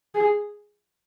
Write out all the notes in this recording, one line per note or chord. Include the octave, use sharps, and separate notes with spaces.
G#4